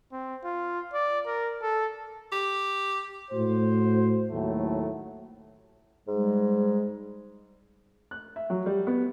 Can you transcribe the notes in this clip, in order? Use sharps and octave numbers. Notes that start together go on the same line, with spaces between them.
C4
F4
D5
A#4
A4
G4
A2 F#4 C5
D#2 A2 F#3 A3
G#2 G3 G#3
F#6
E5
F#3
G3
B3